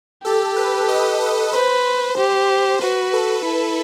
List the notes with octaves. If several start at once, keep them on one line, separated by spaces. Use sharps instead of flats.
G4 A4
B4
D#5
D#5
B4 C5
G4
F#4 B4
A4
E4